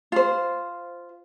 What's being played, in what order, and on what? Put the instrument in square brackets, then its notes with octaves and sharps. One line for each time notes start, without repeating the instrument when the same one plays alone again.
[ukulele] F4 C5